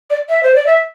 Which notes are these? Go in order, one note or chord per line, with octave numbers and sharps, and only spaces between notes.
D5
E5
C5
D5
E5